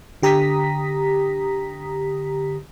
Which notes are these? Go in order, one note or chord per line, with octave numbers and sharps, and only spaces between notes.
D3 G4 A#5 D#6 A#6 B6